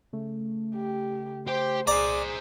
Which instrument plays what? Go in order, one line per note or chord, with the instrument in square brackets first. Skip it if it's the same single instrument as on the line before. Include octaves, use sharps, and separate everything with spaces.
[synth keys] C#3 A3
[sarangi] G4
[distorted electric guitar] G4 G5 [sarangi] C5
[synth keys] C2 [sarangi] G#4 [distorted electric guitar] C5 A#5 [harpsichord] D5